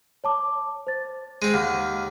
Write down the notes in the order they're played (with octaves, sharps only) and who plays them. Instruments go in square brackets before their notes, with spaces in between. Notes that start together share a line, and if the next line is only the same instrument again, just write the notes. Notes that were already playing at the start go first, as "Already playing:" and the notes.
[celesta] C#5 A5 D6
C5 A6
[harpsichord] G#3 C4 [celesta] D#7
[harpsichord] D#2 [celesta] F#5 F6